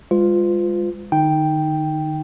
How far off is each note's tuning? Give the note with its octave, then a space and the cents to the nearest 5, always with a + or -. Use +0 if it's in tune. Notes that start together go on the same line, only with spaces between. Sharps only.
G#3 -35 F4 +0 B4 +45
D#3 -45 D#4 +0 G5 +0